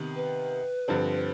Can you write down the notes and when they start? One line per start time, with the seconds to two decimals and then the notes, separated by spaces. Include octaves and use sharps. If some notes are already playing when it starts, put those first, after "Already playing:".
Already playing: C3 D#3 B3
0.15 B4
0.88 G2 D3 F3 C4